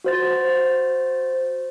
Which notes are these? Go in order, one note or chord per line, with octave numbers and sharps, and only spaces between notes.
F#4 C5 A6